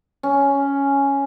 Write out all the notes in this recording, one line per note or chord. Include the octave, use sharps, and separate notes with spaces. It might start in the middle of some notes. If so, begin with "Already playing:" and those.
C#4